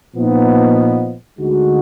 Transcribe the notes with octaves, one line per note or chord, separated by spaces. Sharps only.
A#2 F3 B3 D#4
D2 D3 G#3 D#4 F#4